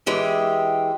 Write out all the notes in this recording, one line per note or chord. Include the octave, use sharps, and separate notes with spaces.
E3 G#3 G4 E5